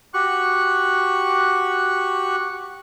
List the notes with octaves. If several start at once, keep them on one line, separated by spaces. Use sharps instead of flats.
F#4 G4 C#6 F#6